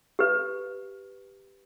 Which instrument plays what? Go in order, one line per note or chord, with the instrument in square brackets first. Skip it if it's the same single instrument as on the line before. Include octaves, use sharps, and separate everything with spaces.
[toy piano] G4 B4